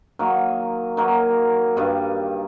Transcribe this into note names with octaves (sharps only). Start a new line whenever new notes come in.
D#3 F#3 A#3
D#3 F#3 A#3
G2 D#3 G3